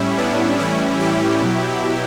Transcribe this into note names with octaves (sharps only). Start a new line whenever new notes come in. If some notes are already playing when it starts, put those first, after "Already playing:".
Already playing: A2 G3 C#4 E4
B3 D4
A2 E3 G3 C#4 E4
E4 G4
B2 F#3